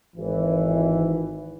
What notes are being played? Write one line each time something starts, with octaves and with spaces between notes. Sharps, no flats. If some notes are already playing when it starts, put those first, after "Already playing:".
G#1 E3